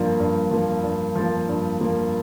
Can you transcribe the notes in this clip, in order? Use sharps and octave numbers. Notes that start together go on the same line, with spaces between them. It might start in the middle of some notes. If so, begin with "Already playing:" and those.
Already playing: G2 F3 A#3
G2
F3 A#3
G2
F3 A#3
G2
F3 A#3